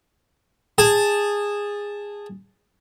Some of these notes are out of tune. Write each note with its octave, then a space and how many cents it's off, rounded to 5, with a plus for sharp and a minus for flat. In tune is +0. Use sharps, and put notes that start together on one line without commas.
G#4 -15 A5 +0